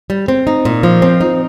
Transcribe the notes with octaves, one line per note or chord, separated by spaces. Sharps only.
G3
C4
D#4
A#2
F3
C4
D#4